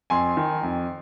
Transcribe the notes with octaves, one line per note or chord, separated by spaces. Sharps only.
F2 G#5 C6
D#3
F2